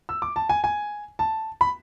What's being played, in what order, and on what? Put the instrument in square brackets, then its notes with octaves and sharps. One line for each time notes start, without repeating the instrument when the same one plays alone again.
[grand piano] E6
D6
A5
G#5
G#5
A5
B5